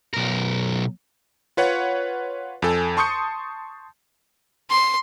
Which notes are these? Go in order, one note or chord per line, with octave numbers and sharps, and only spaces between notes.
B1 A#4
F4 B4 C#5 F#5
F2 A4 G#5
A5 C6 C#6 D#6 G6 C#7
C6